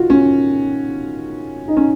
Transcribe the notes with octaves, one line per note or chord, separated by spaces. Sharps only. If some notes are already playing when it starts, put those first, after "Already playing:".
Already playing: D#3 F4 F#4
C#4
D#4
C#4